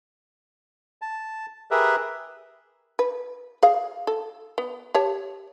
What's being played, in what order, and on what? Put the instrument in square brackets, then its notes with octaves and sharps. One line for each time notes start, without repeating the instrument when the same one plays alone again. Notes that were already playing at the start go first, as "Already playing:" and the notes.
[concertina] A5
G4 G#4 A#4 B4 E5
[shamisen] B4
G#4 F5
A4
B3
G4 C#5 A5